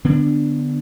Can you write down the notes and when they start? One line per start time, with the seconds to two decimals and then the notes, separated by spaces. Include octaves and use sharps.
0.05 D3 B3 D4